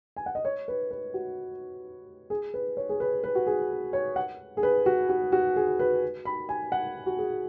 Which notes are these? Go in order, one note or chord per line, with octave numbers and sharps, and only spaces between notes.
G#5
F#5
D#5
C#5
B4
B4
F#4
G#4
B4
C#5
G#4
B4
B4
F#4
G#4
C#5
F#5
G#4
B4
F#4
F#4
F#4
G#4
B4
B5
G#5
F#5
F#4
G#4